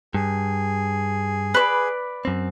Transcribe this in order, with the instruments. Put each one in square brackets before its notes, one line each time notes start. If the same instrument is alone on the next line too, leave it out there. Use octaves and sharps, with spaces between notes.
[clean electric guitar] G2 [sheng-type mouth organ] G#4
[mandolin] B4 C5 D5
[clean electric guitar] F#2 C4